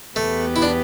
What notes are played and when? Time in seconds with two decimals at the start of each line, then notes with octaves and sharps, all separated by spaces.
0.16 E2 E3 A3 B3 G4 B4
0.56 E4
0.62 D4